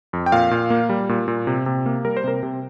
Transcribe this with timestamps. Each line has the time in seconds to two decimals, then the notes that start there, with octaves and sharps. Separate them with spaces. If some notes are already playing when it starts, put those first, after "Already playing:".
0.13 F2
0.26 G5
0.32 A#2 F5
0.51 A#2
0.70 A#3
0.89 G3
1.09 A#2
1.28 A#2
1.47 C3
1.66 C3
1.86 A#3
2.05 G3 A#4
2.17 C5
2.24 C3 A#4
2.43 C3